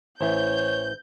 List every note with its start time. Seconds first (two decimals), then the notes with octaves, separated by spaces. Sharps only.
0.21 A1 E3 C5 C#5 G6